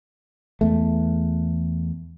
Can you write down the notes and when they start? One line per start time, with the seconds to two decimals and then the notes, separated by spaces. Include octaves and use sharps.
0.61 E2 A3